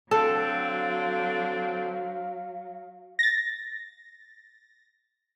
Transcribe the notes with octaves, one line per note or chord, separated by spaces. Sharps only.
D3 F#3 C4 A4 F5
A6 A#6